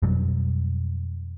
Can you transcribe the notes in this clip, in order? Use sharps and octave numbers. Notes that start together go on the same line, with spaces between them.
F2 B2 F#3 G3